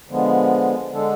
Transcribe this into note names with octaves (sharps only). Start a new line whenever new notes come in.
D3 F3 G#3 B3
D3 G#3 D4 A4